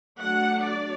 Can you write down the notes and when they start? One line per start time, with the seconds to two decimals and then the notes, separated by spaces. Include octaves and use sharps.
0.19 F#3 A3 D4 F#5
0.64 D5